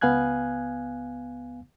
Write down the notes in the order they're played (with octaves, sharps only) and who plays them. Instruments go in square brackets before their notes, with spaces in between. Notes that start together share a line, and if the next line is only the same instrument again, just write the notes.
[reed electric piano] C#2 B3 F5 G#5 F#6 G#6